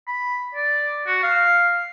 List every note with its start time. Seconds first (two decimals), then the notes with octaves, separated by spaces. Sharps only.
0.07 B5
0.55 D5
1.07 F#4
1.23 F5